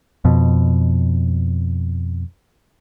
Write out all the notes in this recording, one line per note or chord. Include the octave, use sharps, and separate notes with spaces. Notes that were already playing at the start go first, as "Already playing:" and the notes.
F2 B2